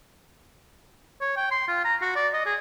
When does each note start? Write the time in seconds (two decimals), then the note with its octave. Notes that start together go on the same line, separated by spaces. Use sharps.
1.21 C#5
1.36 G5
1.51 C6
1.68 F4
1.84 A#5
2.02 F#4
2.16 D5
2.33 D#5
2.46 G#4